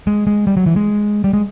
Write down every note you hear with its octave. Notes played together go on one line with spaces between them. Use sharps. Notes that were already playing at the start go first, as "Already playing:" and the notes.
G#3
G#3
G3
F#3
E3
G#3
G3
G#3